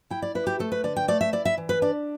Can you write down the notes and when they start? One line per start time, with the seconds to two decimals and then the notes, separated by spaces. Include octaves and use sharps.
0.10 E4 G5
0.22 D5
0.35 E4 B4
0.47 G4
0.59 A3 A4
0.72 B4
0.84 D3 D5
0.96 G5
1.08 A3 D5
1.21 E5
1.33 E4 D5
1.45 E5
1.58 E3
1.69 B4
1.82 D4 D5